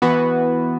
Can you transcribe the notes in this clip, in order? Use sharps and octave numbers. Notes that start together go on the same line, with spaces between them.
E3 B3 F#4 B4